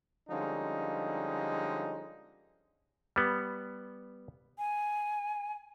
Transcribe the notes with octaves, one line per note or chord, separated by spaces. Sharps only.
D3 F3 G3 G#3 C#4 D#4
G3 B3
G#5